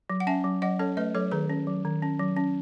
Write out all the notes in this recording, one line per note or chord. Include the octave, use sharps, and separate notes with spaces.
F#3
F#5
C#4 E5 G#5
F#3
F#3 D#5 F#5
C#4 A4 C#5
A3 B4 D#5
F#3 A4 C#5
D#3 G#4 B4
C#4
F#3
D#3
C#4
F#3
C#4